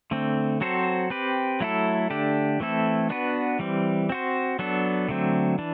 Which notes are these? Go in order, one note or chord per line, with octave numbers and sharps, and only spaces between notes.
D3 A3 C4
F#3 C4 F#4 A4 C5
C4 G4 B4
F#3 A3 E4 A4
D3 A3 D4 G4
E3 A3 C4 E4 A4
B3 D4 F#4 B4
E3 G3 C4
C4 F#4 C5
F#3 B3 D4 A4
D3 F#3 A3 C4
E3 D4